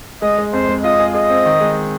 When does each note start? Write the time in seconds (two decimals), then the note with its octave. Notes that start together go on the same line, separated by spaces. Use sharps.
0.22 G#3 D#5
0.38 G#3
0.53 F2 C5
0.69 G#3
0.84 F4 D#5
1.00 G#4
1.15 G#4 D#5
1.30 C4
1.46 D#3
1.61 G#3